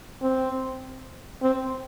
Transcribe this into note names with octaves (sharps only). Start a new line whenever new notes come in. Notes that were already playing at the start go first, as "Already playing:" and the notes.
C4
C4